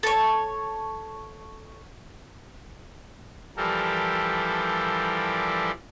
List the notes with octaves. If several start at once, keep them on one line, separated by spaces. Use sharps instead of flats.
A4 C#5
E3 F3 G3 G4 A4 A#4